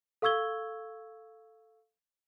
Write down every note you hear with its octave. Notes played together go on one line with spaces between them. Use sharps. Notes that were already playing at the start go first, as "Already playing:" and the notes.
A4 F5 C#6 E6 G#6 G7